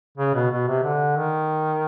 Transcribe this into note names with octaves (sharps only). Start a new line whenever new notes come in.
C#3
B2
B2
C3
D3
D#3